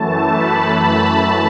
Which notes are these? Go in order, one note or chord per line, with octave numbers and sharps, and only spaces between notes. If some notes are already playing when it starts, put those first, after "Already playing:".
Already playing: F#2 E3 A3 A5
B5
A5